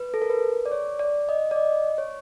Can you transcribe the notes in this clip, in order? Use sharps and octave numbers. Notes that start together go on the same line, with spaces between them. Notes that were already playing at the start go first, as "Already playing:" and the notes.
Already playing: B4
A4
A#4
B4
D5
C#5
D5
D#5
D5
D#5
C#5